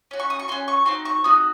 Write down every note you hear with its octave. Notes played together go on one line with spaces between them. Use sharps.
C#4 F#4
C#6
D#6
C#6
C#4 F#4 C6
C#6
C4 D#4 F#4 C6
C#6
C4 D#4 F#4 D#6